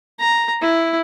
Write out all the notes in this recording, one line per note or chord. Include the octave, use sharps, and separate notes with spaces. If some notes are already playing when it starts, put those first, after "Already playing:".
A#5
E4